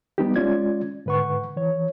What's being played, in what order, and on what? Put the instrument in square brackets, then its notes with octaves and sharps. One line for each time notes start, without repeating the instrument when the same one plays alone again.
[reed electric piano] G3 B3 D#4 G4
G#3 C#4 F4 D5 G#6
G#2 D3 B4 F#5 C#6
E3 C#5